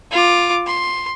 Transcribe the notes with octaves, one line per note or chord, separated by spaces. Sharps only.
F4 D6
C6